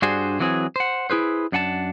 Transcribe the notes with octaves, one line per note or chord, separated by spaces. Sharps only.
G2 D4 F#4 G#4 C5
E3 F#3 C4 G#4
C5 F#5
E4 G#4 B4 C5
F#2 D4 F#5 G#5 A5